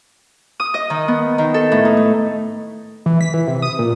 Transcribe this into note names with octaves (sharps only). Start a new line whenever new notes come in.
D#6
D#5
D#3
B3
D#3
A4
A2
D#4
A3
E3
B6
E3
C3
D#6
A#2